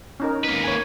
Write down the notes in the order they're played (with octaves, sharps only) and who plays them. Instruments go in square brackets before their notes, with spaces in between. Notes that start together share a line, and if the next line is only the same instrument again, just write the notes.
[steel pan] C#4 D#4 A#4
[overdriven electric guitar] A#3 B4
[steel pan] C#5 G#5